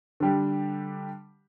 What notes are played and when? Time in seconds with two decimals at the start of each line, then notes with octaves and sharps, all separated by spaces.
0.20 D3 G3 D4 G4